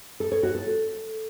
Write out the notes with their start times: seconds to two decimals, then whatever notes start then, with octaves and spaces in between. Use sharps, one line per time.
0.20 A4
0.32 C#5
0.43 F#4
0.55 A4